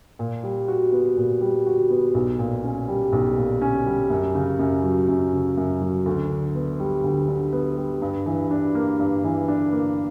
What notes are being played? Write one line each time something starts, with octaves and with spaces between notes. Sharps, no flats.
A#2
G3
F#4
B3
A#2
G3
F#4
B3
B1
A#2
C#4
G3
B1
A#2
C#4
G3
F#2
C#3
F#2
F#3
F#2
C#3
F#2
F#3
D2
D3
B3
G3
D2
D3
B3
G3
G2
E3
D4
A#3
G2
E3
D4
A#3